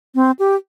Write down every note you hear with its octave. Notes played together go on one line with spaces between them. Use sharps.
C4
G4